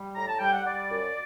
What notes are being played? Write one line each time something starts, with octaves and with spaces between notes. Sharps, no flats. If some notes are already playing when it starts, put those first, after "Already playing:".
Already playing: G3
A2 A#5
A5
G3 G5
F#5
G3 D5
F#2